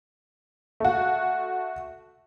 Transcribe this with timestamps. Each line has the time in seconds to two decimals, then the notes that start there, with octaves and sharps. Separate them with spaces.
0.80 A3 F#4